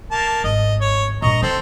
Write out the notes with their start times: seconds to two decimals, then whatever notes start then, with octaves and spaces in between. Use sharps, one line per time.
0.11 A#3 A5
0.44 G#1 D#5
0.81 C#5
1.22 G2 A#2 D#5 A#5 C#6
1.42 E3 F3 C4 A4